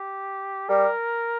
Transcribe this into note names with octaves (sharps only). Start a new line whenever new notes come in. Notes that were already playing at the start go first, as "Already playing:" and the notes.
Already playing: G4
G3 A#4